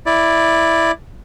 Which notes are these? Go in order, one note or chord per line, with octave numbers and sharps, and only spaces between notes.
E4 D5